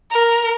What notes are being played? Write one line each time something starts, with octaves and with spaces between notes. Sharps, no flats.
A#4